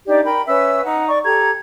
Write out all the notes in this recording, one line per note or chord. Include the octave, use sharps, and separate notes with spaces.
D4 D#4 G4 D5
A#4 G5 B5
C#4 B4 E5 E6
D#4 F#5
D5 C#6
G4 A4 A#5 G#6